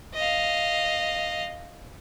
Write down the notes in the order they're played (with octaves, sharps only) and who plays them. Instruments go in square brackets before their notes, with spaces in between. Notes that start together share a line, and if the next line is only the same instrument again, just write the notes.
[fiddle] D#5 F5